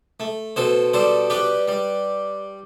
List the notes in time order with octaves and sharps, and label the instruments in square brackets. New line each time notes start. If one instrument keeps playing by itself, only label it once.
[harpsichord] A3
B2 A4 C5
G3 A4 C5
G3 G4 B4
G3